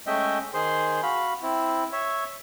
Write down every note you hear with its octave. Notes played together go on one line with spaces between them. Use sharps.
G#3 A3 C#4 D#5 E5 G5
D#3 G#4 C5 C6
F#4 F5 B5
C4 E4
C#5 E5